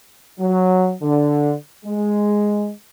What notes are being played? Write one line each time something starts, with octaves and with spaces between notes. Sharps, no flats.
F#3
D3
G#3